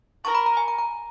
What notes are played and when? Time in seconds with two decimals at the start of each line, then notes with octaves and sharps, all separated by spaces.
0.24 A#4 C#6
0.35 B5
0.46 A#5
0.57 G#5
0.68 A#5
0.78 A#5